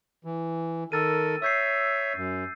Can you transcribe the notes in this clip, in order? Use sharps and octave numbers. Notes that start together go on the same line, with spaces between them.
E3
D#3 A4 A#4 E6 A6 D#7
C#5 E5 E6 G6 C7
F#2